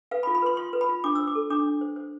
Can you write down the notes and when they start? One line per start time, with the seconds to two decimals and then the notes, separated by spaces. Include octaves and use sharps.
0.11 B4 F5
0.23 B5
0.27 F4
0.35 B5
0.42 B4 C6
0.57 F4 C6
0.73 B4
0.81 B5
0.89 F4
1.04 D4 D6
1.15 C5 E6
1.27 D6
1.35 A4
1.50 D4 D6
1.66 D4
1.81 C5
1.96 C5